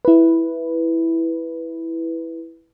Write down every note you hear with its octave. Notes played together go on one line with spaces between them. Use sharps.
E4 B4